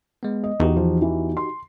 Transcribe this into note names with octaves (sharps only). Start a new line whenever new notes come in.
G#3 B3
D#5
E2 D#4 F#4 G4
F3
E3
C6